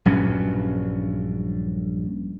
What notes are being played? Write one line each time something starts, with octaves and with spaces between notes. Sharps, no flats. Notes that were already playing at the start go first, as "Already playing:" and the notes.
A#1 G2 F#3 C#4